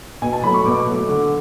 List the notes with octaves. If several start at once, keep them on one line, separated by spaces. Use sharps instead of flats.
B2 G#5
A5
F#3 A3 B5
C#6
B2 D6
F#3 A3
D3